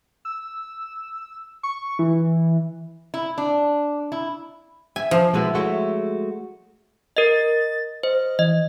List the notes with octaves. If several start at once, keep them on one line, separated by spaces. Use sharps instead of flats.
E6
C#6
E3
E4
D4
E4
E5 G#5
F3 C#4 C5
B2 D3 G#3 B3 E4 F#4
F#2 G#3 A3 F#4 C#5 E5
A#4 D#5 A6
C5 D#5
E3 D#5